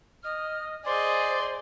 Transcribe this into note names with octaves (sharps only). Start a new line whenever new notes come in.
D#5 F6
G#4 C5 D5 D#5 C6